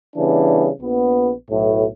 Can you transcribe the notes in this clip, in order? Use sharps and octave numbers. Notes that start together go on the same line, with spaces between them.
C#3 E3 G3 B3 D4
A#1 B3
B1 A2